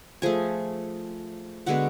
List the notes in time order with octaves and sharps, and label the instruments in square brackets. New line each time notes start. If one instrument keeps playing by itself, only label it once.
[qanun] F3 A3 G#4 G#5
D3 G#3 B3 F#4 F#5